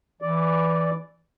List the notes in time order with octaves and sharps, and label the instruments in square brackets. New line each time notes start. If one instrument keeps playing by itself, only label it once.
[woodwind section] E3 [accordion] D5